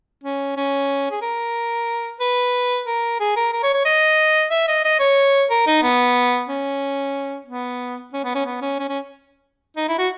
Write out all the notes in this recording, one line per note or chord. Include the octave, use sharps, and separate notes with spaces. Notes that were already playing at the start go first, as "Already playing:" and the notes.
C#4
C#4
G#4
A#4
B4
A#4
G#4
A#4
A#4
C#5
C#5
D#5
E5
D#5
D#5
C#5
A#4
D#4
B3
C#4
B3
C#4
B3
C#4
B3
C#4
C#4
C#4
D#4
E4
F#4